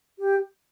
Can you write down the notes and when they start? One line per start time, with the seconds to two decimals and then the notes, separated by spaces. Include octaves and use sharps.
0.19 G4